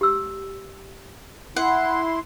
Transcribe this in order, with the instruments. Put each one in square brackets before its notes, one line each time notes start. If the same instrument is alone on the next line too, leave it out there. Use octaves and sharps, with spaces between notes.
[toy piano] G4 E6
[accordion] E4 C6 [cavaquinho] F#5